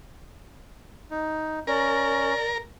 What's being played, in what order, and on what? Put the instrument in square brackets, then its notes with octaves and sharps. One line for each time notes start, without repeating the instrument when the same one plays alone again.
[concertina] D#4
[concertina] C#4 [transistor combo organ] A#4 [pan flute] D5